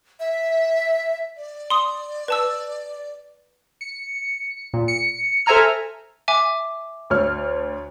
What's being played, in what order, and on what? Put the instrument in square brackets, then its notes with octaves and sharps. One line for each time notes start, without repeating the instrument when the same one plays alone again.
[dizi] E5
D5
[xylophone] C6 D#6
B4 A5 E6
[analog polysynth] C#7
A#2
C#7
A4 C5 E5 G#5 A#5 F6
[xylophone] E5 G#5 D6
[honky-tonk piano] D2 C#5 F6